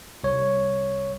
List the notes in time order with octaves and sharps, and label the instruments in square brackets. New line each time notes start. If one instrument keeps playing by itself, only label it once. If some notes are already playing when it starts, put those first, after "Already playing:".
[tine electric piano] C2 C#5